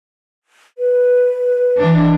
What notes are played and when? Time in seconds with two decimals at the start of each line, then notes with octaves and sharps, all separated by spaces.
0.78 B4
1.78 E3 D4